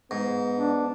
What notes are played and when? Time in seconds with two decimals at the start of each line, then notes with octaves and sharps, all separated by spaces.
0.11 G#2 B3
0.56 D4